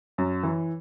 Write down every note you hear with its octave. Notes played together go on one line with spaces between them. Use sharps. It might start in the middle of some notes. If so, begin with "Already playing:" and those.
F#2
E3